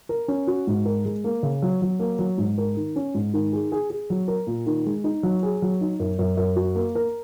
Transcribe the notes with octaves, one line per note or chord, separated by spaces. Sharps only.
A#4
C#4
F#4
G#2
A#4
G#3
A#3
C#3
F#3
F#3
A#3
F#3
G#2
A#4
D#3
C#4
G#2
D#3
G#4
G#4
G#4
F#3
A#4
A#2
D#3
G#3
D#4
F#3
G#4
F#3
D#4
F#2
F#2
F#2
F#4
A#3
A#4